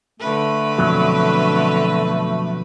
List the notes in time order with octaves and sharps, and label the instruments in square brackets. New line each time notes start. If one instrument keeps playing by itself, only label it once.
[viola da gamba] D3 B4 [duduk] A3
[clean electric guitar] F2 B2 F#3